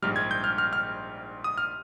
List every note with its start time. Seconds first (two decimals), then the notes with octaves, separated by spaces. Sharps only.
0.02 A#1 G#2 G3 F6
0.16 G#6
0.31 G6
0.44 F6
0.58 F6
0.73 F6
1.44 D#6
1.58 F6